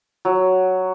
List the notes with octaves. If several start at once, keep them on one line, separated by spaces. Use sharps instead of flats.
F#3